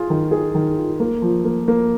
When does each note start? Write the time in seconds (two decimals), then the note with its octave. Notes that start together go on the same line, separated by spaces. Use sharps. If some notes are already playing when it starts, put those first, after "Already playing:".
Already playing: F4 G#4
0.10 D#3
0.31 G#4
0.55 D#3
0.77 F4
1.00 A#3
1.22 F3
1.45 A#3
1.68 A#3